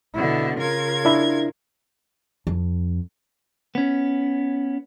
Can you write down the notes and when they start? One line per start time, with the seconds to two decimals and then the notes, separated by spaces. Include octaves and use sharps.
0.15 B2 D3 E4
0.58 C#3 F4 A#4 G#6
1.05 D4 E4
2.47 F2
3.75 B3 C#4